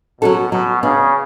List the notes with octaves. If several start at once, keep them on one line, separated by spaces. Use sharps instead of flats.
B2 F#3 C#4 F#4 A4
B2 F#3
C#3 B3 D4